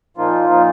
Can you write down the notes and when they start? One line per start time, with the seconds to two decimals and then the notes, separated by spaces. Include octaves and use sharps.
0.17 A#2 F3 A#3 D#4 F4
0.49 A#2 F3 A#3 D#4